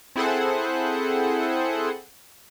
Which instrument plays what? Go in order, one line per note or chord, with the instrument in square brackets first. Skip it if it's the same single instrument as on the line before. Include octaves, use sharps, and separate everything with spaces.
[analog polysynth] C4 E4 G#4 A4 C5 F#5